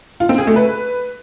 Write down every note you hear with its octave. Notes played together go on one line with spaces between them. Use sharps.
F4
C4
G#4
A3
B4